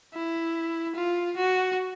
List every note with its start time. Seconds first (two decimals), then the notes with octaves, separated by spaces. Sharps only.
0.14 E4
0.95 F4
1.37 F#4